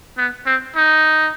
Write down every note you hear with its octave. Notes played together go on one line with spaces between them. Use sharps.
B3
C4
D#4